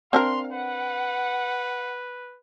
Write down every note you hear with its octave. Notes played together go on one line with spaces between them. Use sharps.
C4 D4 A#4 F5 C6
B4 F#5